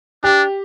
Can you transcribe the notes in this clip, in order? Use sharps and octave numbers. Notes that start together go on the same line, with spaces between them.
D4 G4